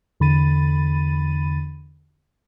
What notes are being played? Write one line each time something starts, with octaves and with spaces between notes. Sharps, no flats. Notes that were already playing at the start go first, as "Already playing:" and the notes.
E2 D3 B5 A6 D#7